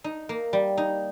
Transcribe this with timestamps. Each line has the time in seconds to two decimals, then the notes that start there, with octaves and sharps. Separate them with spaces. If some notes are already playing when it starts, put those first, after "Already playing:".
0.04 D#4
0.29 A#3
0.53 G3
0.78 D#4